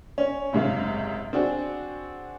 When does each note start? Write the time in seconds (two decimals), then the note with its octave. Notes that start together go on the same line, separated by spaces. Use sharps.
0.18 C#4
0.53 F#1 G#2 C3 F5
1.33 C4 D4 F#4 G#4